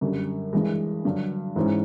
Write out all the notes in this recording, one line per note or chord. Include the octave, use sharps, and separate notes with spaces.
F#2 D3 G3
G2 E3 G#3
G2 D3 F#3
G#2 E3 G#3 C#4